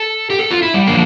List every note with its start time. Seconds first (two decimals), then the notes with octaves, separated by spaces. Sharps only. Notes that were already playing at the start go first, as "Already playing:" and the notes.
Already playing: A4
0.30 G4
0.39 A4
0.51 F4
0.63 E4
0.74 G3
0.87 D3 F3 A#3